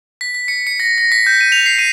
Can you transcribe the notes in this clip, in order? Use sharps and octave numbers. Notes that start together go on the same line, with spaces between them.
B6
B6
C#7
C#7
A#6
A#6
B6
G6
D#7
F7
C7
D#7